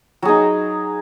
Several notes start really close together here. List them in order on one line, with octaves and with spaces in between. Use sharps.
F#3 G#4 D#4